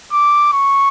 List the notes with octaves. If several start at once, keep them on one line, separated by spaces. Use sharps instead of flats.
D6
C#6